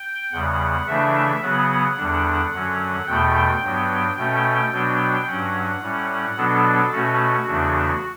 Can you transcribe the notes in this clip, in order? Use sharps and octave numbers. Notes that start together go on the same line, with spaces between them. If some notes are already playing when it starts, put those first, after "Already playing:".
Already playing: G5
E2 C#3 G3 F#5
C#3 E3 A3 D4 E5
C#3 F#3 B3 F#5
E2 D3 G3 D4
F#2 D3 F#3 C#4
E2 B2 A3 G5
G2 F#3 B3
B2 A3 C#4 G5
B2 F#3 B3 D4
G2 F#3 C#4 F#5
A2 G3 C#4
B2 F#3 B3 D4 A4
B2 A3 C#4 F#4
E2 C#3 E3 A3 D4